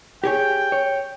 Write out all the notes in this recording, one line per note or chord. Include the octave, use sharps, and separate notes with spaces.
G4 G#4 C#5 G5
C#5